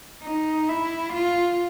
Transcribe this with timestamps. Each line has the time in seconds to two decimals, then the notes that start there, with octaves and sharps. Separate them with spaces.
0.23 D#4
0.68 E4
1.13 F4